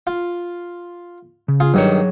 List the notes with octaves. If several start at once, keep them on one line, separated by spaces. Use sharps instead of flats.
F4
C#3
F4 G#4
G2 D#3 F#3 G#4 C#5